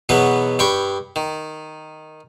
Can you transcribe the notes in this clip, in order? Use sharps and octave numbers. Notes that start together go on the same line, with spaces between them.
E2 B2 F#3 B3 B4
G2 G5 B5 C#6
D#3